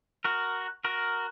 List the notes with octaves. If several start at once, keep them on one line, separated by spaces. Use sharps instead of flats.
F#4 A#4
F#4 A#4